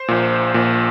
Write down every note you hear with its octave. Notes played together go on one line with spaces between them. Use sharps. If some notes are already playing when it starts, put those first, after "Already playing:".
Already playing: C5
A#1 A#2
A#1 A#2